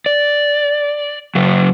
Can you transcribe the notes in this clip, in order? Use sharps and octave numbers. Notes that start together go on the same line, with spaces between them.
D5
C#3 F#3